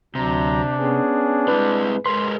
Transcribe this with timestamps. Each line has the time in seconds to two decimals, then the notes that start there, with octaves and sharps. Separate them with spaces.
0.15 D2 C3 F#3 D4 A#5
0.78 B3 C#4 G#4
1.48 G#3 C4 E4 B4
2.06 G#3 G#4 A#4 B4 C6